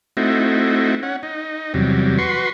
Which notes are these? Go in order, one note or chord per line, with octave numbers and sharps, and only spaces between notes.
A3 C4 D#4 E4 F#4
C#4 F#5
D#4
E2 C3 F#3 G3
F#4 B4 C6 C#6